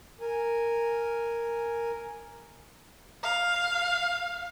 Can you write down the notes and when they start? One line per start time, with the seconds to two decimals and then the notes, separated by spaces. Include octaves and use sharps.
0.21 A#4 G#5
3.23 F5